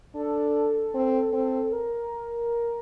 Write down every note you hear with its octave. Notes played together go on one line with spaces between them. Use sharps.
D4 A4
C4
C4
A#4